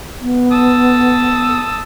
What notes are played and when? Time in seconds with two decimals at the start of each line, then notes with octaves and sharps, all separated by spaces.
0.21 B3
0.52 A5 D#6 E6